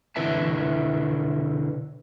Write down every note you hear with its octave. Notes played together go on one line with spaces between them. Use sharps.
B2 D3 E4 B4 E5 A5